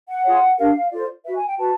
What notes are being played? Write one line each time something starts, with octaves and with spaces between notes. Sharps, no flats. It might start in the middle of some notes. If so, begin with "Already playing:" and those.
F#5
F4 G#4 C#5
D4 G4 A#4 F5
F4 A4 C5 D5
F#4 B4 E5
G#5
G5
F#4 B4 A5